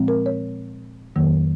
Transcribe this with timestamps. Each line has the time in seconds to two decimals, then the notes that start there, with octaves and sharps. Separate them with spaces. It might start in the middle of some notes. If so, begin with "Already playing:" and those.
Already playing: A#2 F3 G#3 C4
0.08 A#4
0.26 C#5
1.16 F2 D#3 F#3 A#3